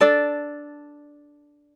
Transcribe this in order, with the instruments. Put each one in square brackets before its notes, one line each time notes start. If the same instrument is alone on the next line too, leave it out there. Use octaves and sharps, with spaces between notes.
[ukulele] D4 A4 D5